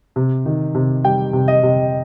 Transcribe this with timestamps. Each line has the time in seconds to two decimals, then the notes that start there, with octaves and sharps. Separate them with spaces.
0.16 C3
0.46 D#3
0.75 C3
1.04 G3 G5
1.33 C3
1.48 D#5
1.63 C3